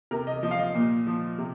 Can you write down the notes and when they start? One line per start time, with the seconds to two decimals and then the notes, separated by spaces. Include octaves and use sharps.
0.11 C3 A#4
0.27 D#5
0.43 F3 D#5
0.51 F5
0.59 D#5
0.74 A#2
1.07 F3
1.38 C3